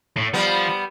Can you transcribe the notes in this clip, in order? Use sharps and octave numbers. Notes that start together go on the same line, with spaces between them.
A2
F3 G3 B3